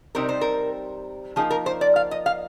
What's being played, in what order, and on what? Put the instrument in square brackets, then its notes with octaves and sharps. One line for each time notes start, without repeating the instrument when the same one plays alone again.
[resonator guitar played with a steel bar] C3 G3 C4 D#4 A#4
C5
A#4
F3 A#3 D#4 G#4
A#4
C5
D5
F5
D#5
F5